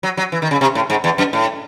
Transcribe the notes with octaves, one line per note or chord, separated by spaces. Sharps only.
F#3
F#3
E3
D#3
C#3
C3
A2
G#2
E2
F#2
A2